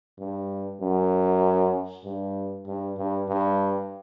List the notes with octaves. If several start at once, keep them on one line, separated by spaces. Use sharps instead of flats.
G2
F#2
G2
G2
G2
G2